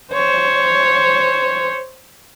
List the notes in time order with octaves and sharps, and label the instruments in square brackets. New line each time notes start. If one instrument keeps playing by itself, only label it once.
[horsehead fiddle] C5 C#5